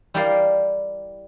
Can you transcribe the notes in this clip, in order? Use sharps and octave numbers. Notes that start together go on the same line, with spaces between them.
G3 E4 G4 A#4 D5 F5